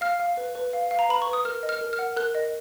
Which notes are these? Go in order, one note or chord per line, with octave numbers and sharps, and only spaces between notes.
F5 F6
F5
B4
B4
F5
F5
A#5
B4 B5
B4 C#6
D#6
A#4 F6
D#5
F6
A#4
F6
F#5
A#4 F#6
D#5